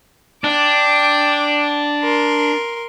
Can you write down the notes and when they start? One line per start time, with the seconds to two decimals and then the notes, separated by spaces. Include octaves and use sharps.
0.44 D4 G5 D6
2.02 A#4 C6